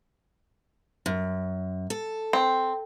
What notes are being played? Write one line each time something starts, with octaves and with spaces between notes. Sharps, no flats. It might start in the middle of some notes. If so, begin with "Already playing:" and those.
F#2
A4
C4